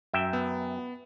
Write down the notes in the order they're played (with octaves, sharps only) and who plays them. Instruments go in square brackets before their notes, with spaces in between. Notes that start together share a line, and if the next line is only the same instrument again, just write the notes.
[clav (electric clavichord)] F#2 E5 G5
[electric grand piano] B3